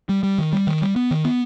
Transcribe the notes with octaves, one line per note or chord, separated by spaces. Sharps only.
G3
G3
D#3
G3
D#3
G3
B3
D#3
B3